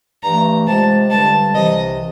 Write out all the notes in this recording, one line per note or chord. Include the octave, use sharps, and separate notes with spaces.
G2 E3 A3 A#5
C3 F3 G#3 A5
G2 D3 G3 A5
C2 C3 E3 D#5